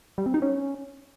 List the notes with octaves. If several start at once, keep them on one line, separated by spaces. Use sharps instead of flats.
G3
C4
D#4
C#4